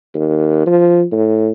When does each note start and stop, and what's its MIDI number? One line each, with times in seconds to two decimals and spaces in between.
0.15 0.65 39
0.67 1.05 53
1.12 1.51 45